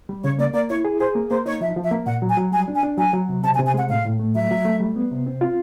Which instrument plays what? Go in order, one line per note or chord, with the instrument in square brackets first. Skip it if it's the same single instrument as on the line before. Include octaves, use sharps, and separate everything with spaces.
[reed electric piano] G3
[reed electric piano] C#3 [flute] C#5
[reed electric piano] A#3 [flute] D5
[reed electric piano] A#3 [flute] D5
[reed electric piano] E4 [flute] C#5
[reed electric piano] G#4
[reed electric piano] G#4 [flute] C5
[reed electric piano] A#3
[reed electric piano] A#3 [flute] C5
[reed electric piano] D#4 [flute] C#5
[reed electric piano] F3 [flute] E5
[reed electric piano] F3
[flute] E5
[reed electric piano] A#3
[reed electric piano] A#2 [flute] F#5
[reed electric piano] F#3
[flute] G#5
[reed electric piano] F#3
[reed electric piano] G3 [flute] G#5
[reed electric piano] D4
[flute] G#5
[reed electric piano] D4
[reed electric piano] F#3 [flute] G#5
[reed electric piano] F#3
C3
[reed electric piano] C3 [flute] A5
[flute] G#5
[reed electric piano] C3
[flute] G#5
[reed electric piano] G#3 [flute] F#5
[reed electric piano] A2 [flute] F5
[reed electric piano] A2
A3
[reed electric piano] F#3 [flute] E5
[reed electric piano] F#3
A3
G3
B3
C3
C4
F4